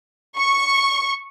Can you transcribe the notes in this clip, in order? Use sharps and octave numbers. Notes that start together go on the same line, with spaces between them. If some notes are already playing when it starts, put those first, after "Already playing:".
C#6